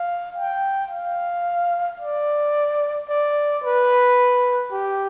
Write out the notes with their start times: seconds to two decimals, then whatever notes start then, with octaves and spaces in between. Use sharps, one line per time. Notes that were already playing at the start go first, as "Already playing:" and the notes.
Already playing: F5
0.36 G5
0.91 F5
2.00 D5
3.09 D5
3.63 B4
4.72 G4